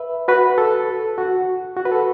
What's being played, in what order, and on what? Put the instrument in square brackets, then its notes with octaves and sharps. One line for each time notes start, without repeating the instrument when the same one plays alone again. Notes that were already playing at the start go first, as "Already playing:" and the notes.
Already playing: [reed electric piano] B4 E5
F#4 B4
A4
F#4
F#4
B4
A4